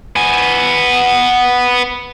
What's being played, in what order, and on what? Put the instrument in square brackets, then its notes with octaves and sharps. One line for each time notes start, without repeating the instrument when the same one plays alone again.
[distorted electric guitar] B3 G#5